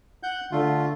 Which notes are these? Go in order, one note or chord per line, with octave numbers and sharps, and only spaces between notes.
F#5 G6
D3 A3 F4